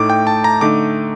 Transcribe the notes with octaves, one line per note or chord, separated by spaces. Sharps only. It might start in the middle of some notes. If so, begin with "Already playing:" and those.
Already playing: A2 A3 D#4 D6
G5
A5
A#5
D3 A3 D#4 D6